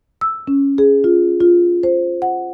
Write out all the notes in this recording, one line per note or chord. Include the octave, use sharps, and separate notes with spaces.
E6
C#4
G#4
F4
F4
C5
F#5